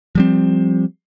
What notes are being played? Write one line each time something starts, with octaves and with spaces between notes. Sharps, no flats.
F3 G3 C4